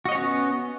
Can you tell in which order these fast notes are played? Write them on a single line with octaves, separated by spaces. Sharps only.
F#4 D#5 C#5 C#4 B3